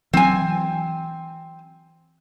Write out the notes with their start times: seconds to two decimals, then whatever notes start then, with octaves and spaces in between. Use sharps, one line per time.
0.13 E3 F#3 C4 G#5